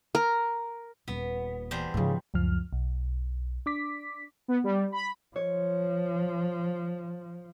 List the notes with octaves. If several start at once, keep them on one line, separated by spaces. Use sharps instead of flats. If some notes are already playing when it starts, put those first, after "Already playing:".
A#4
D#1 A#2 B3
E2 G3 C5
G#2 C#3 F3
C#2 F#2 F3 F6
B1
D4 D6 B6
B3
G3
B5
F3 C#5